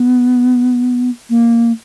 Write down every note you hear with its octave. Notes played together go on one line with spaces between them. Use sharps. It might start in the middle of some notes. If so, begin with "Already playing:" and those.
Already playing: B3
A#3